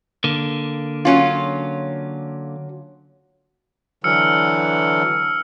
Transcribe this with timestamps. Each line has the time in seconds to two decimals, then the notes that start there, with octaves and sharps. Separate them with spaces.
0.24 D3 A#3
1.05 F#3 C#4 F4
4.04 D3 E3 F#3 E6 F6 C#7